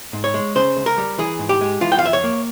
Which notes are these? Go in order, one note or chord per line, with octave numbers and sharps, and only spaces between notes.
G#2
C#5
G#3
C#3 C5
C#2
A#4
G3
E3 G#4
G#2
G4
G#3
E3 F4
G5
F5
F2 E5
C#5
A#3